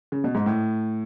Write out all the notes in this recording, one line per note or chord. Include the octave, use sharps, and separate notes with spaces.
C#3
B2
G#2
A2